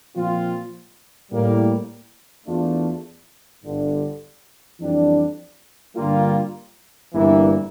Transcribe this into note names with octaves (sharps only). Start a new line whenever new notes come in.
A#2 F3 C4 F4
A2 G3 A#3
E2 E3 A3 D4 F4
G1 G2 D3
F2 E3 G3 D4
G2 D3 G3 A#3 F4
G1 G2 E3 A#3 E4